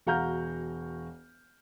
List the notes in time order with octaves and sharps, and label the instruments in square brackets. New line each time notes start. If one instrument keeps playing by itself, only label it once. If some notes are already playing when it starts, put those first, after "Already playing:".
[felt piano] E1 F#4 F5 A#5 F6 G6